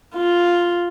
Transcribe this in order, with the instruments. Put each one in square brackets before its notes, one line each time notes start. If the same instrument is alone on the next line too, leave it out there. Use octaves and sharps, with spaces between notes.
[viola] F4